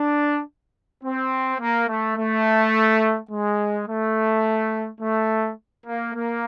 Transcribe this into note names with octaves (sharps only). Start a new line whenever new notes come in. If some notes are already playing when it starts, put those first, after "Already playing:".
Already playing: D4
C4
A#3
A3
A3
G#3
A3
A3
A#3
A#3